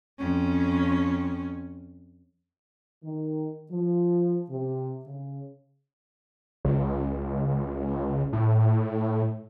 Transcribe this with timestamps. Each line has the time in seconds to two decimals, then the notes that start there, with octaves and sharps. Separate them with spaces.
0.19 F2 C#4
3.03 D#3
3.71 F3
4.49 C3
5.06 C#3
6.65 C#2
8.33 A2